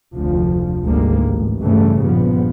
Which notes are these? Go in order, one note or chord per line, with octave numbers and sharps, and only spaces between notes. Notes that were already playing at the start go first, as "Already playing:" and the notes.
F1 D2 F3
G#1 D2 G#2 G3 G#3 A#3
A1
G2 C#3 E3 A3
A#1 G2 F3 B3